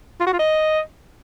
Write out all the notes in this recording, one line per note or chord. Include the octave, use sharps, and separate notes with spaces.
F4
F#4
F4
D#5